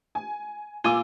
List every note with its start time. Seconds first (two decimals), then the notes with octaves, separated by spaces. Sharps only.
0.15 G#5
0.85 A#2 F4 G#5 D6 E6